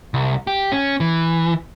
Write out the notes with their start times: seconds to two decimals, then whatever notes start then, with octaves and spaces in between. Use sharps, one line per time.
0.14 C2
0.47 G4
0.72 C#4
1.00 E3